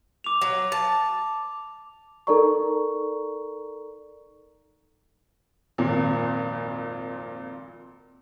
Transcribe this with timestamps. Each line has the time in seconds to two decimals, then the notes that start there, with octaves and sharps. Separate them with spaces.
0.24 D6 F7
0.41 F#3
0.72 A5
2.27 D#4 A4 A#4 D5 A#5 C#6
5.78 G#1 F2 A#2